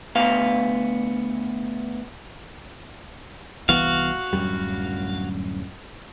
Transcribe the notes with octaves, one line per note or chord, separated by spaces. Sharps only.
D2 B3 F5
C2 E3 B3 F#4 F5
D1 F#2 G3